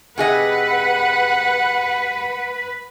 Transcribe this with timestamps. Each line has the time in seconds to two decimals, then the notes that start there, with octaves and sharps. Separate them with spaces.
0.18 C3 G#4 B4 D#5 F#5